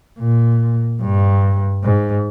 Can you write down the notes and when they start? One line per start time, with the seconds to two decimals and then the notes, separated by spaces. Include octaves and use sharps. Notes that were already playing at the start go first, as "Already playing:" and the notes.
0.19 A#2
1.02 G2
1.83 G#2